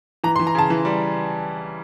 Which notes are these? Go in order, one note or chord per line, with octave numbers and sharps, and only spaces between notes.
E3 A#5
C6
E3
A#5
C#3 A5
E3
G3